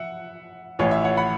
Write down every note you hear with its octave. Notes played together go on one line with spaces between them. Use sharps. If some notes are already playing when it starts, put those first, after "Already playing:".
Already playing: E5 F#5
A1 A2 E3 C#5
E5
C#5 F#5
F#5 B5